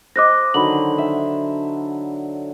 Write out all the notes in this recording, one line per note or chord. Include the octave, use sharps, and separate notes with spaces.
C5 D#5 D6 F#6 A#6
D3 D#3 F#3 B5 F#7
E5